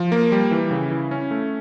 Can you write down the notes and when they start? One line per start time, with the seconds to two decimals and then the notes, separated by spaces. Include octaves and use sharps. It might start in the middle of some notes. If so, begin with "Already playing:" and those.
Already playing: F3
0.12 A#3
0.32 G3
0.51 E3
0.71 C#3
0.91 E4
1.11 C#4
1.31 A3